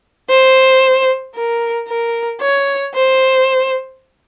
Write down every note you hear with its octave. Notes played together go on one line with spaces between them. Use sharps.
C5
A#4
A#4
C#5
C5